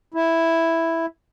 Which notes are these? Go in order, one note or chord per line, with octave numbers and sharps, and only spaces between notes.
E4